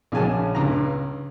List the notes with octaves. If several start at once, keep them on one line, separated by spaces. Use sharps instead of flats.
A#1 C#3 F#3 G#5 A5
C#2 G2 A#5